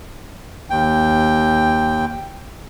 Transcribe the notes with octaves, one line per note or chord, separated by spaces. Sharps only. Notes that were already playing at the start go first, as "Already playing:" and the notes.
D#2 G5